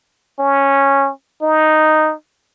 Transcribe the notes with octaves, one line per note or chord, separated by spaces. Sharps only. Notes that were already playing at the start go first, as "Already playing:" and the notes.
C#4
D#4